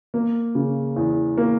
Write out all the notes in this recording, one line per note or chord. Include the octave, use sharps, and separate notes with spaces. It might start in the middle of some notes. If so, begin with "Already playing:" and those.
A#3
C#3
E2
A#3